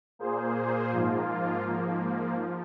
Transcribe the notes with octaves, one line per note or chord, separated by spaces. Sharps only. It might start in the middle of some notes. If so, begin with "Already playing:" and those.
A#2 A#3 G#4 C5
G#2 F3 A#3 F4
G#2 F3 A#3
F3